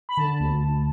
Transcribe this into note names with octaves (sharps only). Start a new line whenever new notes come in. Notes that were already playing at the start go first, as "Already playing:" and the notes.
B5
D3 A5
D2
D2